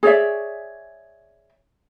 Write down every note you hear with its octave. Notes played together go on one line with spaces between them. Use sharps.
G#4 C#5 D5 E5